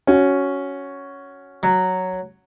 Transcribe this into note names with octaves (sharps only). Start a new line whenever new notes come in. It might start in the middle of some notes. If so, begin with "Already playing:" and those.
C#4 F#4
F#3